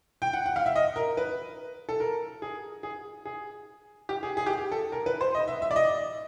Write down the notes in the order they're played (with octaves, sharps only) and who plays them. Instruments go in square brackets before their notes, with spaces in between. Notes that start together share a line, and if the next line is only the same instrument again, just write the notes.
[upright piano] G5
F#5
F#5
F5
E5
D#5
A#4
B4
A4
A#4
G#4
G#4
G#4
G4
G#4
G#4
G4
G#4
A4
A#4
B4
C5
D#5
E5
E5
D5
D#5